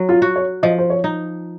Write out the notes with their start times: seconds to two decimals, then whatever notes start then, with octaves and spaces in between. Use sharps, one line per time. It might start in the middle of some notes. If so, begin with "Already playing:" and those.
Already playing: F#3
0.09 F4
0.22 F#4
0.36 C#5
0.63 F3 D#5
0.78 C5
0.90 C#5
1.04 D#4